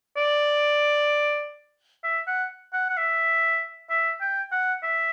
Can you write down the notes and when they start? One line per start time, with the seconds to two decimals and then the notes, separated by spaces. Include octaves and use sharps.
0.17 D5
2.04 E5
2.27 F#5
2.73 F#5
2.90 F#5
2.97 E5
3.90 E5
4.21 G5
4.52 F#5
4.83 E5